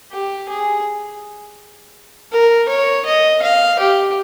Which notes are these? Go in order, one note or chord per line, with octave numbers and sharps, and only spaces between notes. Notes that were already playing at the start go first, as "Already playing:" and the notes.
G4
G#4
A#4
C#5
D#5
F5
G4